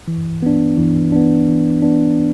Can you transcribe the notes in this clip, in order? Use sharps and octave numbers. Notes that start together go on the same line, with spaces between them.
E3
B3 D4
E3
B3 D4
E3
B3 D4